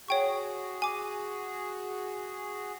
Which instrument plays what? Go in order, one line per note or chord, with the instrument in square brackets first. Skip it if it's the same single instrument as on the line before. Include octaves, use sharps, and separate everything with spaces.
[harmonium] F#4 G#4 [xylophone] C#5 G5 C#6
[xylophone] G#5 D6